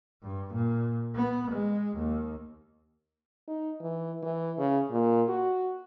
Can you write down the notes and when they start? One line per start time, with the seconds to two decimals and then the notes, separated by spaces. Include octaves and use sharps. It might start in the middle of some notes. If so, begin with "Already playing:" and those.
0.22 G2
0.53 A#2
1.15 B3
1.51 G#3
1.97 D#2
3.48 D#4
3.81 E3
4.23 E3
4.58 C#3
4.90 A#2
5.29 F#4